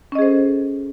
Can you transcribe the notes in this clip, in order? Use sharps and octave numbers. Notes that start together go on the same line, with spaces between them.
C#4 G#4 A4 C5 D#5